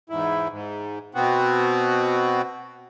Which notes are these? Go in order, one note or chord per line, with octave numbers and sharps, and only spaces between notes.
E2 G#2 E4
G#2
B2 B3 C4 F#4